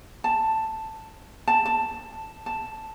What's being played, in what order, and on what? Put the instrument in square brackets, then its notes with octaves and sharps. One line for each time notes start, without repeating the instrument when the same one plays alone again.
[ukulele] A5
A5
A5
A5